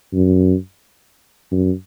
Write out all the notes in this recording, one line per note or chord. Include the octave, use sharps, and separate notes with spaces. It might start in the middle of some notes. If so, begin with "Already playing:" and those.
F#2
F#2